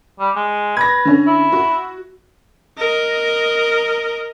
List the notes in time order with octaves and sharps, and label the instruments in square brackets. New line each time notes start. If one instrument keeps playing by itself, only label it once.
[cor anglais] G3
G#3
[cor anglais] B4 [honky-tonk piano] G#6 A#6
[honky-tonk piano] D3 C#4
[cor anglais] E4
[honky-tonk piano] F#4
[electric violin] A#4 D#5